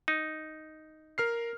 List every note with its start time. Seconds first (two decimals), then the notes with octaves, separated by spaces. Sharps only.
0.08 D#4
1.18 A#4 F6 C7